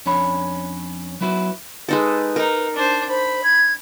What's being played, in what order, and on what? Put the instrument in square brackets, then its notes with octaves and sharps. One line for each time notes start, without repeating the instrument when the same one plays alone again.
[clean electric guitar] F2 C#4 D4 C#5 B5
F#3 B3 E4 F#4 B4
[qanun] G#3 D#4 A4 [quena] B4
[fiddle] D#4 [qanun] A#4
[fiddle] D4 C5
[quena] C5 [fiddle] B5
[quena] G#6